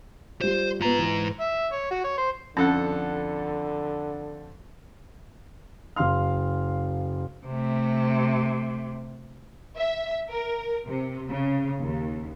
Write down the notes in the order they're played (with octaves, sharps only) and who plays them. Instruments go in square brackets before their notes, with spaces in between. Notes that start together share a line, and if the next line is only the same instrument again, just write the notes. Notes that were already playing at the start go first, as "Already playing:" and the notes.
[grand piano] G3 F4 [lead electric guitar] C5
[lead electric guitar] G#2 A#5 [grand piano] B3 F4
[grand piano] E3
[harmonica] E5
C#5
F#4
C#5
C5
[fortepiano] F2 A4 F#5 [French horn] D3 [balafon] C#4
[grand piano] F#1 F5 C6 F6
[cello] C3 A3
[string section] E5
A#4
C3
C#3
D#2